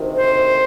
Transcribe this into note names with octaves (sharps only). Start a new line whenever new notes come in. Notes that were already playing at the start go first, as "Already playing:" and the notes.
Already playing: D2 C3 D#3
C5